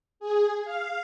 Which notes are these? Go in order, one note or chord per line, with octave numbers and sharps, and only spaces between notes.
G#4
F5